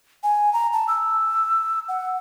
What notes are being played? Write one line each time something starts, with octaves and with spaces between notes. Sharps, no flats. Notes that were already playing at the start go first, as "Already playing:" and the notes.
G#5
A#5
A5
E6
F#5